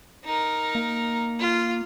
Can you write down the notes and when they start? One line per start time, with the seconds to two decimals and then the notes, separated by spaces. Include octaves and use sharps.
0.25 D#4 A#4
0.75 A#3
1.40 F4